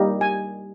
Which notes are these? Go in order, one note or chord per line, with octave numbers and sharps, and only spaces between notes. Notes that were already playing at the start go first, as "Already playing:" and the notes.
Already playing: G3 A#3 D#4 G4
G#5